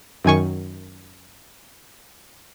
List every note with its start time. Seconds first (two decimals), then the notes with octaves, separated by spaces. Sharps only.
0.24 F#2 D#3 G#5 C#6